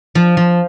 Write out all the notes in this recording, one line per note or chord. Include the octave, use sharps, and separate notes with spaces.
F3
F3